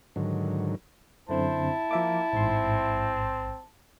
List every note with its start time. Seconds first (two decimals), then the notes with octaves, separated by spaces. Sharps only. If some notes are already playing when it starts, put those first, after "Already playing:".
0.16 G#2 D3 D#3 F#3
1.29 F#2 D3 C4 E4 C5 A5
1.91 F3 A#3 E5 D6
2.33 A1 G#2 C4 C6